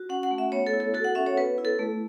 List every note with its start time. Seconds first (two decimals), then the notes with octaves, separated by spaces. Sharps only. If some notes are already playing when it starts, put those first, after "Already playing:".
Already playing: F#4
0.09 C#4 F#5
0.23 F#5
0.31 A3
0.38 E5
0.52 B3 C#5
0.67 A4
0.73 E4
0.80 A4
0.94 F#4 A4
1.04 F#5
1.15 C#4 E5
1.27 C#5
1.37 B3 B4
1.58 E4
1.65 A4
1.79 A3